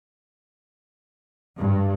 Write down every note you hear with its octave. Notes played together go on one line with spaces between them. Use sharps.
G2